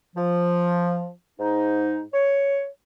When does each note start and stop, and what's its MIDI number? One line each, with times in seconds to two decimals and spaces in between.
0.16 1.09 53
1.39 2.01 44
1.39 2.01 63
2.13 2.68 73